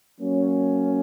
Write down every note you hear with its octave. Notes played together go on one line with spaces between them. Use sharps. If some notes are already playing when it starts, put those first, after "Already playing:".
F#3 A#3 C#4